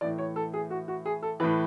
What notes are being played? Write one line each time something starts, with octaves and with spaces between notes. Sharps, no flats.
A2 E3 D5
C#5
A4
G#4
F#4
F#4
G#4
A4
A2 E3 B4